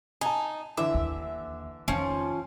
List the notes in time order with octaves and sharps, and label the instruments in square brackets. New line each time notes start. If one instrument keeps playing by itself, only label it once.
[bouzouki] D#4 [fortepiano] G#5 A5
[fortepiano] D3 E3 D6 [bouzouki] E5
[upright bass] D#2
[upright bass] F2 D#3 [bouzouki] F3 C#4